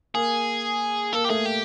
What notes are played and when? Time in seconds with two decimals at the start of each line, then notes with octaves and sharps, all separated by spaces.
0.14 A#3 G#4
1.13 A#3 A4
1.24 G4
1.29 A3 G#4
1.45 G4